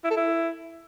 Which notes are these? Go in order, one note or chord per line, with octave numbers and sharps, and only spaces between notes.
E4
A4
E4